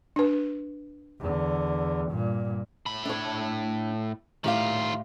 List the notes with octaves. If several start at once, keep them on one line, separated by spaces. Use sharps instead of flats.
D4 B4
E2 D3
G2 A#2
A2 B5
D4 C#5
A2 D#3 F4 G4 F5